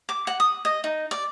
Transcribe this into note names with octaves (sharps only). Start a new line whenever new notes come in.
D6
F#5
D#6
D#5
D#4
D5